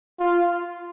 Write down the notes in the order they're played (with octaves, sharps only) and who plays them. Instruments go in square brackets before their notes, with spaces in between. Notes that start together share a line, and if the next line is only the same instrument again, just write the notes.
[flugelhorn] F4